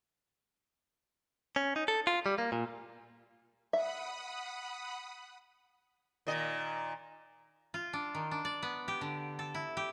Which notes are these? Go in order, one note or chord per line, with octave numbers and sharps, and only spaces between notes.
C#4
D#4
A4
F4
G3
A#3
A#2
E5 F#5 B5 D#6
A#2 D#3 D#5
F4
D4
D#3
D4
D5
B3
G4
D3
A4
E4
G4